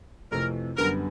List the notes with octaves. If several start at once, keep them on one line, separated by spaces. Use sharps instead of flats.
F2 C3 E3 A3 A#4
F#2 D3 G3 B3 A#4